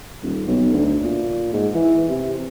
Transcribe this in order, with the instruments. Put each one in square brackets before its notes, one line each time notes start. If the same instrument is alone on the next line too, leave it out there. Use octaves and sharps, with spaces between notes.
[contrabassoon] D#1
B1
D2
A#2
G#2
E3
C3